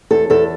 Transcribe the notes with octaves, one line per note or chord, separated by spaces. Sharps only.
E2 A4
E2 A4